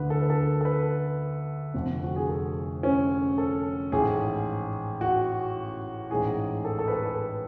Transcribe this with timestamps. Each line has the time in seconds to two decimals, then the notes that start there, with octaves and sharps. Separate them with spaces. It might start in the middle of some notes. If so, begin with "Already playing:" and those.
Already playing: D2 D3 B4
0.10 A4
0.21 B4
0.30 A4
0.61 A4
0.65 B4
1.74 F1 F2 D3
2.04 F#4
2.16 G#4
2.29 A4
2.83 C#4
3.38 A4
3.92 A1 G#2 G#4
5.01 F#4
6.11 A1 G#2 G#4
6.65 A4
6.79 A4
6.88 B4
6.92 A4
7.05 B4